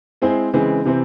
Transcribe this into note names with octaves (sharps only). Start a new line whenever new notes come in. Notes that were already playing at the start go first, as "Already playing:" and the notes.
G#3 C4 E4 G#4 C5
C#3 E3 G#3 C4
C3 E3 C4